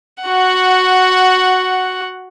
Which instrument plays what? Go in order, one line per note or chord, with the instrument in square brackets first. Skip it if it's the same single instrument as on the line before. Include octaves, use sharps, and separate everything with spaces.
[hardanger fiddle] F#4 F#5